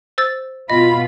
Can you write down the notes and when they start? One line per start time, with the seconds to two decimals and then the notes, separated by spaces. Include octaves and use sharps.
0.18 C5 E6 A6
0.70 B2 F4 D#5 B5